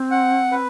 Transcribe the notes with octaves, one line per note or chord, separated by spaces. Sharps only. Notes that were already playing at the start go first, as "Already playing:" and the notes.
Already playing: C4
F#5
B4